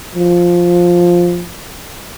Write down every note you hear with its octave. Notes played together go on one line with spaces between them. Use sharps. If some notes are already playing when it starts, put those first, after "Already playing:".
F3